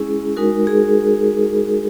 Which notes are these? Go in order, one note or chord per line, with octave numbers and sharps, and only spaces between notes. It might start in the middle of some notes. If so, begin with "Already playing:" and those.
Already playing: G#3 C#4 E4 G#4
G#3 D#4 F#4 A#4
G#4